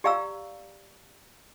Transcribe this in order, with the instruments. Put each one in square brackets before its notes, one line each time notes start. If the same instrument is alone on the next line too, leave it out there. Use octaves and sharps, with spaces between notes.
[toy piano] G4 D5 F5 A#5 E6